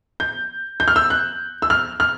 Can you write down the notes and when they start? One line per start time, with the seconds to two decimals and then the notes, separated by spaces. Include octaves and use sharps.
0.20 G6
0.80 G6
0.88 F6
0.96 E6
1.10 F#6
1.62 E6
1.70 F6
2.00 F6